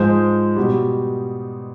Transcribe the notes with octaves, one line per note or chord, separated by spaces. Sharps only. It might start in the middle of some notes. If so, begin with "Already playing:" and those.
Already playing: G#2 F3 G#3 C5
B2 G3